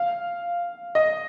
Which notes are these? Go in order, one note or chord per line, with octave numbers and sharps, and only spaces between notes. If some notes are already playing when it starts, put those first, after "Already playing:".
Already playing: F5
D#5